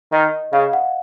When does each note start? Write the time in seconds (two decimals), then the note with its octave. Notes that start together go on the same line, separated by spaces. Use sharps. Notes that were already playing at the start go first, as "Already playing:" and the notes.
0.12 D#3 D#5
0.52 C#3 F5
0.73 F#5